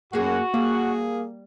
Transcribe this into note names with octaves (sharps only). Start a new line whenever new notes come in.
F#2 A#3 F#4 G#4
G3 A#3 G#4